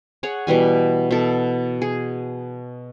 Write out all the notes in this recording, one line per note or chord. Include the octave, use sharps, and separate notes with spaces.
G#4 C#5 F#5
B2 E3 G3 G#5
B2 A4
G#4